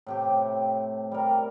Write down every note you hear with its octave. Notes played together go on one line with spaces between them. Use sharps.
A2 C3 G4
G3 A#4